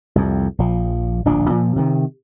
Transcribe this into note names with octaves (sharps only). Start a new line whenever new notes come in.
C2 F2
A#1 F3
D1 A#1 F3 D4
A#2 F3
C3 D#3